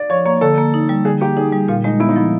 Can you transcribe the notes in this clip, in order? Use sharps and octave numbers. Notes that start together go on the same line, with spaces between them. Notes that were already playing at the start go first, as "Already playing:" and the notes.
Already playing: D5
F3 C#5
A#3 C#5
D3 A4
A#3
D#4
G3
D3 G#4
A#3 G4
D#4 G#4
G3
A#2 F4
G#3 D#4
B3 E4
D#4
F3 E4